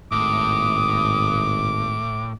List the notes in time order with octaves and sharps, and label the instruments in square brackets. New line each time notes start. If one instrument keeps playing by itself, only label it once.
[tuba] G#1 [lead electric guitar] A2 [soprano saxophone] D6 [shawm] D#6